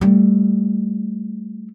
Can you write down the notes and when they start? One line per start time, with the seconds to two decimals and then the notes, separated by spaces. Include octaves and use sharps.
0.01 G3 A3